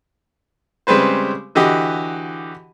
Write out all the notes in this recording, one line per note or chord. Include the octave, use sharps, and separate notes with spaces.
C#3 G3 G#3 C4 B4 C5
D3 E3 F#4 G4 D#5